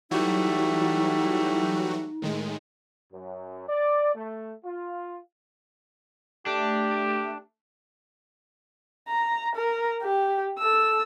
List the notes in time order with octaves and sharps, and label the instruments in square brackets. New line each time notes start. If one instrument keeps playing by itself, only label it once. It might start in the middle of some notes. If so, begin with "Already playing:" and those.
[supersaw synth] E3 F#3 F#4 [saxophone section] G3 A3 E4 [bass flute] D#4
[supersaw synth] A2 D#3 G#3
[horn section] F#2
D5
A3
F4
[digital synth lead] A3 [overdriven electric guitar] D4 [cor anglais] G4
[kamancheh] A#5
A#4
G4
A4 E6